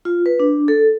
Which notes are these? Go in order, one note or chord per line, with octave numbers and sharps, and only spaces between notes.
F4
B4
D4
A4